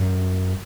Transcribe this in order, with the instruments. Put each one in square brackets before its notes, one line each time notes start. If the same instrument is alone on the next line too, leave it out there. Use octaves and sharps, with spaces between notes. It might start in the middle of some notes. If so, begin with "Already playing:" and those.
Already playing: [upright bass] F#2